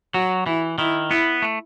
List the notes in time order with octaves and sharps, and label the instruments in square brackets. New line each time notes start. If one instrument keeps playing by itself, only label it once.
[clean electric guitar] F#3 [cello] F#4
[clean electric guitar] E3 [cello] E4
[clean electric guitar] D#3 [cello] E4
[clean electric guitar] B3 [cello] E4
[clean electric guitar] A3